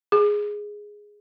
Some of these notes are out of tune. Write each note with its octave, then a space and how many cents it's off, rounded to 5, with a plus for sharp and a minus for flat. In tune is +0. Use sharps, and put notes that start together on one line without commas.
G#4 +0